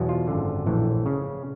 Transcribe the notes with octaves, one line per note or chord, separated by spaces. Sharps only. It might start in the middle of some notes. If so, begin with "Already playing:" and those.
Already playing: E2 B2 F#3
F4
G#1 F#2 D3
A#1 A2 E3
C#3